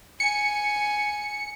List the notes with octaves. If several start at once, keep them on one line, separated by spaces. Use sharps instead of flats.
G#5 C#7